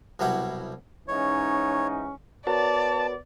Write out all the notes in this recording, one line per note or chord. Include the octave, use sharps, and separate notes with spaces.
C2 B2 F#3 G3 E4 F#5
G#2 E3 C#4 D#4 C#5
B3 F#4 A#4 C#5 D5 A5